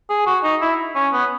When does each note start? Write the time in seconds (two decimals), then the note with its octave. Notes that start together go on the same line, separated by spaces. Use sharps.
0.09 G#4
0.26 F#4
0.43 D#4
0.61 E4
0.95 C#4
1.13 B3